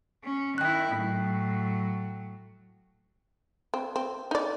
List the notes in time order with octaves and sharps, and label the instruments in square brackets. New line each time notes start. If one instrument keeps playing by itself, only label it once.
[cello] C#4
[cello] D#3 E4 [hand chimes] G5 F#6
[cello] A2 F#3
[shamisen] C4
C4
D#4 D5